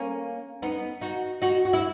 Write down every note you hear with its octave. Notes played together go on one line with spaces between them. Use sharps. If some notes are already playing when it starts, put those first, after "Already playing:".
Already playing: A#3 C#4
B3 D#4
D#4 F#4
D#4 F#4
F#4
E4